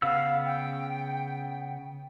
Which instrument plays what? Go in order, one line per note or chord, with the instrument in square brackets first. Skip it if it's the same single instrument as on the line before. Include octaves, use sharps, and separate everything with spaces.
[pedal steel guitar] C#3 B3 E6 [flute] F5
[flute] G5